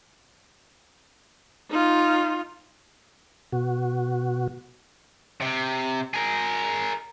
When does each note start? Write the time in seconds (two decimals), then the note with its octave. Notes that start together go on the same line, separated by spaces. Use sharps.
1.69 D#4 F4
3.52 B2 F#4
5.41 C3
6.14 G#4 A#4